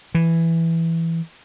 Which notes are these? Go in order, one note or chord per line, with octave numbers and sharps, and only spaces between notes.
E3